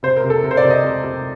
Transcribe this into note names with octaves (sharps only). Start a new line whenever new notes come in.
C3 C5
A#4
C3
A4
C3 A#4
C5
D5
C3
D#5
C3
C3